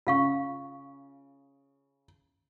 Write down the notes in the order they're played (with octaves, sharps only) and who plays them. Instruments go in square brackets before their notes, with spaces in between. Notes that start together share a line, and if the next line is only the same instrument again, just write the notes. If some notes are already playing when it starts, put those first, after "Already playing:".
[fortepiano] C#3 [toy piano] F4 F5 C#6